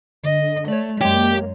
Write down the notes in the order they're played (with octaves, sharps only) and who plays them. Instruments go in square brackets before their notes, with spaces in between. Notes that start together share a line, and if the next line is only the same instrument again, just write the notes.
[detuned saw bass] D3 [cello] D#5
[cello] A3 [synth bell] C#5 D5
[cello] F#2 [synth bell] G#3 C#5 [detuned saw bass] A#3 [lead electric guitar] G4